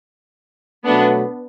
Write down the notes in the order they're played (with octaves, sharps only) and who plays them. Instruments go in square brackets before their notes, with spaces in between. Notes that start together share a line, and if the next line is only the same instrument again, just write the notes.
[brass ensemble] B2 F#3 A3 [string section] B3 D4